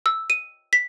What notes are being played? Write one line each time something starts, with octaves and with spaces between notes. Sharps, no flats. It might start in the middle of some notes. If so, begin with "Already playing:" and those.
E6
D#7
B6